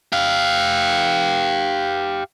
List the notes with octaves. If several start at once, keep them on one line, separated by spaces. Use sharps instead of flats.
G4 F5